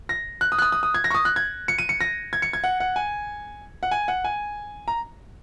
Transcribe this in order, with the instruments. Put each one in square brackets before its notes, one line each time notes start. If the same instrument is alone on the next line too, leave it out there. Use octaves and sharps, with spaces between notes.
[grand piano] A#6
F#6
D#6
F#6
D#6
D#6
D#6
G#6
A#6
C#6
D#6
F#6
G#6
C#7
D#7
C#7
A#6
G#6
C#7
G#6
F#5
F#5
G#5
F#5
G#5
F#5
G#5
A#5